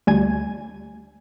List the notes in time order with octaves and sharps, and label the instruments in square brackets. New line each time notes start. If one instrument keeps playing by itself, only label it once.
[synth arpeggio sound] D2 G3 G#5 G#6